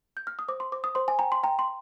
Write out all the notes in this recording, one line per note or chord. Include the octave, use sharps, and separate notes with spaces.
G6
F6
D#6
C5 D6
C6
C5 D6
D#6
C5 C6
G#5
G5 A#5
C6
G5 A#5
C6